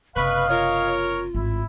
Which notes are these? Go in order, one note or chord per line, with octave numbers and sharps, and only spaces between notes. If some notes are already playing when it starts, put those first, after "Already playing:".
F#1 C3 B4 D#5 F5 C#6
F4 A#4 C#5
G#1 A2 E4